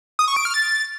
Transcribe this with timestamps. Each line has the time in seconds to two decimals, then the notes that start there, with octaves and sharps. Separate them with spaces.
0.19 D#6
0.28 C#6
0.36 D7
0.45 F6
0.54 A6